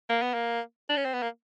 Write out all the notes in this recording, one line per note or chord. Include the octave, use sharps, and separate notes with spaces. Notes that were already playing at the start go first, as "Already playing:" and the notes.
A#3
B3
A#3
D4
C#4
C4
B3
A#3